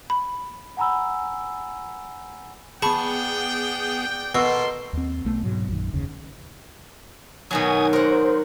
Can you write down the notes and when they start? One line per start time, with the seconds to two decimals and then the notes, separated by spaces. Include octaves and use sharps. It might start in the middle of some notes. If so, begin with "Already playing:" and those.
0.10 B5
0.77 F#5 G#5 A#5 B5 E6
2.82 B3 G#4 D5 F#5 G5 A5 B5 C#6
4.35 B2 A#3 A4 B4 D#5 C6 E6
4.93 D#2 C4
5.25 B1 A3 B3
5.43 G#2 B2 F#3
5.68 A#1 F#2 D#3
5.93 F#1 D#2 C#3
7.51 B2 D#3 F#3 G#5 D#6
7.93 A#4 C5 F#5